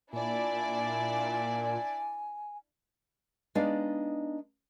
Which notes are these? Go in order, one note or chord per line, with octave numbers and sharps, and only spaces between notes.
A#2 D4 E4 D5 G#5
G#3 B3 D4 D#4 D5 F5